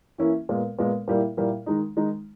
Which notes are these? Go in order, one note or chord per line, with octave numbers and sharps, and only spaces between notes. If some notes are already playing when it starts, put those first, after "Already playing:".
E3 A#3 C#4 E4
A#2 G#3 B3
A#2 G#3 B3
A#2 G3 A#3 E4
A#2 G3 A#3 E4
D#3 G#3 D#4
D#3 G#3 D#4